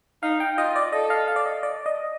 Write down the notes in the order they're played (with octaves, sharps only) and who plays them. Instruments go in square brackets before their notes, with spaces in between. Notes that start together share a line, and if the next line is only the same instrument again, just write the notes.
[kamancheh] D#4 [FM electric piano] F5
[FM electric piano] G5
[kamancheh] F4 [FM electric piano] D#5
[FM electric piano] D5
[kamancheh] A4 [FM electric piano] D#5
[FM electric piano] F5
F5
D5
D#5
D5
D#5